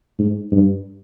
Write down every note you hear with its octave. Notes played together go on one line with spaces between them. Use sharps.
G#2
G2